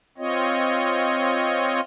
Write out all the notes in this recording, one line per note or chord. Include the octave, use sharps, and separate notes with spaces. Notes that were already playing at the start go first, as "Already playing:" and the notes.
C4 F4 C#5 D#5